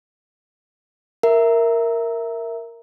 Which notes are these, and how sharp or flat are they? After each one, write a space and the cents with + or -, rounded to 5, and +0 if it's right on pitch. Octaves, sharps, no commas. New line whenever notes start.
A#4 -5 E5 +0